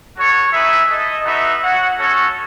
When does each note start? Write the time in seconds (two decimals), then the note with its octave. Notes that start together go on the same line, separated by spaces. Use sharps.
0.17 F#4 A4 C#5
0.53 D#4 G#4 B4 E5
0.89 E4 A4 D#5
1.25 D#4 F#4 B4 E5
1.62 F#4 C#5 F#5
1.98 C#4 F#4 A4 C#5